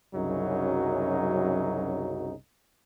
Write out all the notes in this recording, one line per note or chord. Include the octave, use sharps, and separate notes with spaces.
C2 F#2 C#3 F#3 D#4